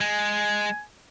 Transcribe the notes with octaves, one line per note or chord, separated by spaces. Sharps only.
G#3 G#5